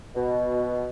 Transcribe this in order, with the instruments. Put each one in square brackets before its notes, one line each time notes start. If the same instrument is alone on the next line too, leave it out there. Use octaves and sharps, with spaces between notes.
[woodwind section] B2